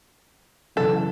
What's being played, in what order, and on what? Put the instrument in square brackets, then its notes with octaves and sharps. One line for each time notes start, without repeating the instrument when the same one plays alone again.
[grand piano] F#2 C#3 E3 [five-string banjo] A4